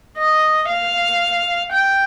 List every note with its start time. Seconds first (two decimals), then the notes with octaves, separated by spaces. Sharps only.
0.18 D#5
0.69 F5
1.72 G5